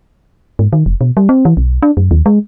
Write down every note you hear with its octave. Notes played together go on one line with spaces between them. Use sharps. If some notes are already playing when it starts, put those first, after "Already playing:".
G#2
D#3
F1
B2
G3
C4
E3
B1
D4
F#2
D#2
G#3